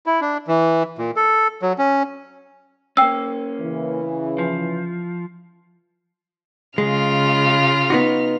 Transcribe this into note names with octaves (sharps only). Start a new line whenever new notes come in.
E4
D4
E3
A#2
A4
F#3
C#4
A#3 C#4 G5 E6
C#3 E3
F3
C#3 G#3 F4 F6
B3 D#4 F#4